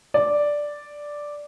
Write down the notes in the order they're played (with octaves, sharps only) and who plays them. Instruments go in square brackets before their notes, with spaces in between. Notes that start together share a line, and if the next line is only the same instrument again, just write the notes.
[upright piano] D5